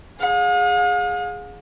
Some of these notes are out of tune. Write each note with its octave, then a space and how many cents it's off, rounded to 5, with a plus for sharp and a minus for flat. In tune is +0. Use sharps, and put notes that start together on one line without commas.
G#4 +0 F5 +45